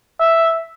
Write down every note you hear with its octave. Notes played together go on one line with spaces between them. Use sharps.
E5